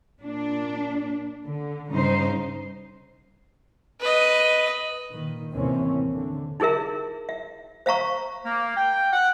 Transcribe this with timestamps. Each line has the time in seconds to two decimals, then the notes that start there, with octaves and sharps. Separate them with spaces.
0.21 A#2 D4
1.45 D3
1.89 G2 C#3 D#4 C5
4.01 B4 D#5
5.09 A#2 D#3
5.52 D#2 A2 C3 E3 C4 C#4
6.13 D3
6.60 D#4 E4 G#4 A#4 E5
7.29 E5
7.86 C5 E5 F5 A#5 C#6
8.45 A#3
8.76 G5
9.13 F#5